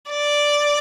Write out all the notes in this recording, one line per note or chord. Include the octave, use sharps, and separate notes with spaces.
D5